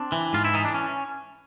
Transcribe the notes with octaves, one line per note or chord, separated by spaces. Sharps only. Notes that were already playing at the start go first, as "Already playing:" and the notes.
Already playing: C4 D4
E3
G#2 F4
E4
E3 D#4
D4
C#4